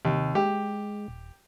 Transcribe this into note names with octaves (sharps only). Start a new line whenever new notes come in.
D#2 C3
G#3 G4
D#1